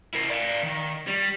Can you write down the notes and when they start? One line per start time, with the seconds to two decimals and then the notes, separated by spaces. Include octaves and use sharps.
0.14 E4 A#4
0.29 D5 F5
0.63 D#3
1.07 G3